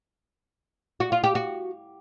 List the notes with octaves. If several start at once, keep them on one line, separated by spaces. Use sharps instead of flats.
F#4
F4
G4
F#4